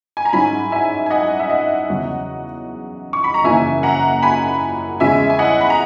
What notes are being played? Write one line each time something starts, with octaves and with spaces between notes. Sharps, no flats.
G#5
A#5
G#2 F#3 C#4 E4 G#5 B5
E5 G#5
G#5
D#5 F#5
E5
D#5 F#5
E2 C#3 F#3
C#6
B5
A#5
F#1 F#2 C#3 E3 A#3 E5 G#5
F#5 A#5
G#5 B5
E2 C#3 G#3 C#4 E4 E5 G#5
G#5
D#5 F#5
B5
A#5